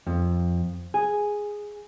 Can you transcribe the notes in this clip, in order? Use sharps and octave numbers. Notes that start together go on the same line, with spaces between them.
F2
G#4